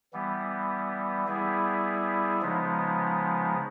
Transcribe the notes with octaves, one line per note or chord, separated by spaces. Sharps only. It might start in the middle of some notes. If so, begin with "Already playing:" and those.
E3 G3 B3
G3 B3 E4 G#4
C#3 F3 G#3 B3 D#4